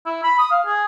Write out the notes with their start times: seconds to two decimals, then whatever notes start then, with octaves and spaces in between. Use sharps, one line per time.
0.06 E4
0.23 B5
0.38 D#6
0.51 F5
0.66 G#4